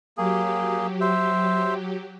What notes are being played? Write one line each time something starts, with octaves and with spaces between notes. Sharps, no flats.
F#3 A#3 G4 G#4
C5 E5